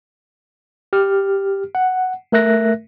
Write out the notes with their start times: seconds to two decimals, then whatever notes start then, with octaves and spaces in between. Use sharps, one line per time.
0.93 G4 F6
1.75 F#5
2.32 A3 A#4 E5 F#6 A#6